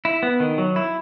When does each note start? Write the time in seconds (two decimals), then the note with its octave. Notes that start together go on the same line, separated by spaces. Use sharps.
0.05 E4
0.23 B3
0.40 D#3
0.58 F#3
0.76 E4